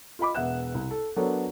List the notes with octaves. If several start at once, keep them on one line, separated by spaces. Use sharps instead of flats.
F4 D#5 B5 D6
E1 B3 E5 F#5 F#6 E7
C2
A4
F#3 B3 D4 A4 A#4 C#5